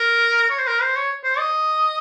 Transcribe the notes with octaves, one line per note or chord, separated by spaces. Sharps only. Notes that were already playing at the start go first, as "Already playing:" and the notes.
Already playing: A#4
C#5
C5
A#4
C5
C#5
C5
D#5